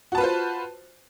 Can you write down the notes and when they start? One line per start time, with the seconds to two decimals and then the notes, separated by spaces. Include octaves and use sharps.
0.12 F#4
0.15 A5
0.18 B4
0.21 F4
0.23 C5